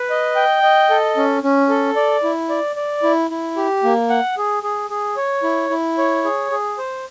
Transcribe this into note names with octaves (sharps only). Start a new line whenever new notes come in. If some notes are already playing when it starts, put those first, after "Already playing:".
Already playing: B4
D#5
G5
D#5
A4
C#4
C#4
A4
D5
E4
D5
D5
E4
E4
G4
A#3
F#5
G#4
G#4
G#4
C#5
E4
E4
C#5
G#4
G#4
C5